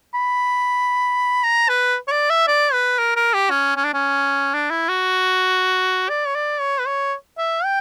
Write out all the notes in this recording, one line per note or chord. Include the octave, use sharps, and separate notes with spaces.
B5
A#5
B4
C#5
D5
E5
D5
B4
A#4
A#4
G4
C#4
C#4
D4
C#4
D4
E4
F#4
D5
C#5
D5
C#5
B4
C#5
E5
G5